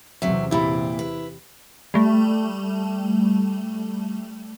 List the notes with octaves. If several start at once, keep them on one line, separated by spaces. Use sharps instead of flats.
E2 C3 F#3 C4 E5
A#2 E4 G4 B5
B4
G3 A3